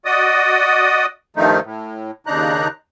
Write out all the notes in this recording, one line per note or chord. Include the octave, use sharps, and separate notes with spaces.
F#4 D5 D#5 D#6
G2 D#3 F3 A3 D#4
A2
D#2 C#3 D4 D#4 A#5 F#6